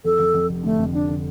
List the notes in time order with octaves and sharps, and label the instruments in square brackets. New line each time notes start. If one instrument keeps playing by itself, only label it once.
[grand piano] F2 [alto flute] A4
[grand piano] F2
F2
F1
[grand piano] D3 [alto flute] A3
[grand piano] F2
[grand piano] F2 [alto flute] D4
[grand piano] D3